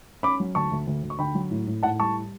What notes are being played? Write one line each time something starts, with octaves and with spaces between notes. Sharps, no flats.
C#4 B5 D6
F#3
D2 A5 C#6
D2
D2
D2
C#6
D3 G5 B5
F#3
A2
A2
A2 F#5 A5
G3 A5 C#6